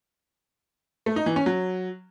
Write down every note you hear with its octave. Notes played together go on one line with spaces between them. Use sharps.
A3
D#4
E3
C#4
F#3